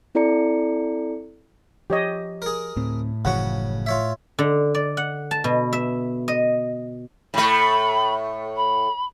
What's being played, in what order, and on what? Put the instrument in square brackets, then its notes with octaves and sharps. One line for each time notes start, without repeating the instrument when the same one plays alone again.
[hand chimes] C4 E4 A4 D5 A#5 C#7
[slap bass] F3 [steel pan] G4 C#5 D#5
[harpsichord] G#4 A#4
[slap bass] D2 C4 [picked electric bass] A2
[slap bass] F#1 E3 F3 [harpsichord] C#3 F#4 C#6 [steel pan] F#5
[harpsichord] F4 C#5 E5
[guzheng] D3
D5
F#5
A5
B2
E5
D#5
[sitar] A2 A3 [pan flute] B5
[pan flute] B5